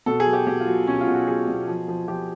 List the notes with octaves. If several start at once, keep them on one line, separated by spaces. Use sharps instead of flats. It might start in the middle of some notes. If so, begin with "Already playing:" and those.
B2 A4
G#4
F#3
G4
B2 G4
F4
F#3
B2 C#4
F4
B2
F#4
F#3 G#4
B2
F3
F3
F3 G4